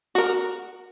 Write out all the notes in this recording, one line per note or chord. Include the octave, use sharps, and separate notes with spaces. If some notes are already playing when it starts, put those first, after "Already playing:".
F#4 A#4